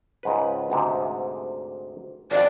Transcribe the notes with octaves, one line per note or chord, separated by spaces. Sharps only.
C#2 G#2 B4
D2 G#2 C3
G#1 F2 D5